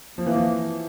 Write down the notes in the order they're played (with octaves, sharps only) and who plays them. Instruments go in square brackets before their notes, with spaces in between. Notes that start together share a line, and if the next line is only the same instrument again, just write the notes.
[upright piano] F3 [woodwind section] A#3
[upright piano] E3
F3